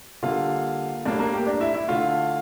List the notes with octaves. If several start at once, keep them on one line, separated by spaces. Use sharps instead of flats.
D3 G3 A#3 F4 F5
A2 G3 A#3 D4 D5
A#3 A#4
G4
D4 D5
E4 E5
E4 E5
D3 A3 F4 F5